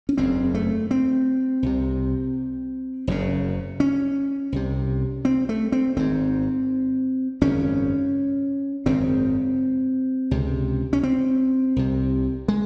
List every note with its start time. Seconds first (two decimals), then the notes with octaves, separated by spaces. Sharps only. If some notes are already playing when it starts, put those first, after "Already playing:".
0.09 C#4
0.18 F#1 E2 C#3 C4
0.54 A3
0.91 C4
1.62 C2 C3
3.07 F#1 F#2 C#3
3.80 C#4
4.52 C2 C3
5.25 C4
5.49 A3
5.72 C4
5.96 G#1 G#2 C4
7.41 G#1 F#2 C#3 C#4
8.86 G#1 F#2 C#3 C4
10.31 C#2 C3
10.93 C#4
11.03 C4
11.76 C2 C3
12.48 G#3